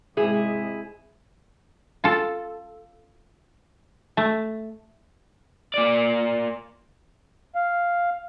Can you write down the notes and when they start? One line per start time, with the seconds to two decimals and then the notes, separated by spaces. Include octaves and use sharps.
0.17 G#2 C3 G#3 E4 G#4
2.04 F4 A4
4.17 A3
5.74 A#3 D5
7.55 F5